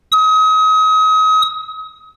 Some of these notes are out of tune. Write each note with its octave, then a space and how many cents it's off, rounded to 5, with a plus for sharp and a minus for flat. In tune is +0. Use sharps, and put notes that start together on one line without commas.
D#6 +35